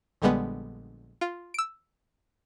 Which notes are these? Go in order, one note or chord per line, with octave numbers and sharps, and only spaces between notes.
A#1 D3 G3 G#3 B3
F4
E6 D7